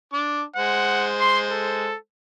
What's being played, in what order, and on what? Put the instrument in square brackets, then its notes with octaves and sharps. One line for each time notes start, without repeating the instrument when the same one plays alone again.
[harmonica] D4 D6
[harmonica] G#3 C5 [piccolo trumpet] F#5
[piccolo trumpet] C6
A4